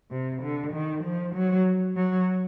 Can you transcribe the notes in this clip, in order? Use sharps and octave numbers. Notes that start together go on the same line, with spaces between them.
C3
D3
D#3
F3
F#3
F#3